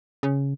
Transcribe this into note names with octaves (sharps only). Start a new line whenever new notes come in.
C#3